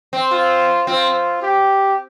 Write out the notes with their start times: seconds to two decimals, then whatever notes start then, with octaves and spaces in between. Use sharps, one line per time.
0.13 C4
0.32 F4
0.87 C4 F4
1.43 G4